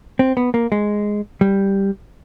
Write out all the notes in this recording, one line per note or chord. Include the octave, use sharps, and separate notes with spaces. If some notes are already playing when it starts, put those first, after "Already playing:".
C4
B3
A#3
G#3
G3